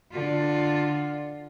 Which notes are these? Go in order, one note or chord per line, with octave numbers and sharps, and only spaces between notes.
D3 F4